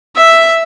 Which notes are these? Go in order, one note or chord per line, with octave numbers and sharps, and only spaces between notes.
E5